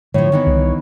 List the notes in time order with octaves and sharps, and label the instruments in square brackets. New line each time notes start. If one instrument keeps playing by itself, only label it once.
[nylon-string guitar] A2 F3 [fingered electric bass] D3 [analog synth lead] C#5
[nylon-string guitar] D#3 E3 B3
[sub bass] C2